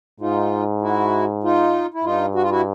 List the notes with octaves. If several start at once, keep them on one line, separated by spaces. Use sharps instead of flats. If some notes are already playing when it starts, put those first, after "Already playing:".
G#2 D#4 F4
E4 F#4
D#4 F4
E4
G2 D#4 F4
F#4
F4
E4 F#4